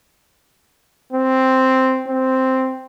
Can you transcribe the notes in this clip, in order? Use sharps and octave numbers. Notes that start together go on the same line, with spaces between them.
C4
C4